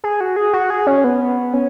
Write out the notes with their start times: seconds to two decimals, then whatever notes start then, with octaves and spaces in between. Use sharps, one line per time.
0.04 G#4
0.21 F#4
0.36 G#4
0.53 F#4
0.70 G#4
0.87 C#4
1.04 B3
1.54 C#4